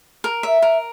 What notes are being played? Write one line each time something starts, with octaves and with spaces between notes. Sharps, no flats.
A#4
E5
A#4